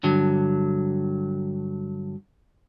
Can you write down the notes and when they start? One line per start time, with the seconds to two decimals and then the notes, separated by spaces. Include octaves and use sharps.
0.03 G2 D3 F#3